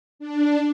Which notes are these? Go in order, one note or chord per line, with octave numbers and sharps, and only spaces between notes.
D4